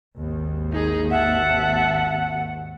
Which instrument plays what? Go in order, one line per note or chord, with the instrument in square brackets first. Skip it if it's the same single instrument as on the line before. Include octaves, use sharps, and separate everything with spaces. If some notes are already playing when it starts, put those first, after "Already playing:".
[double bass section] G#1 D#2
[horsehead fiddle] D#4 G#4
[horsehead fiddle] E5 A5 [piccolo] F#5